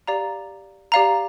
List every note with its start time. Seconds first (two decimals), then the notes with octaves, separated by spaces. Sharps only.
0.07 G4 D5 F5 A#5
0.92 G4 D5 F5 A#5